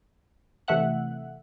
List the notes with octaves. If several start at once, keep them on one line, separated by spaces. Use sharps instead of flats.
C3 E3 A3 E5 F#5 F#6